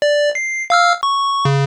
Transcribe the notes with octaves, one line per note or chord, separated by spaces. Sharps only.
D5
C7
F5 E6 F6
C#6
C#3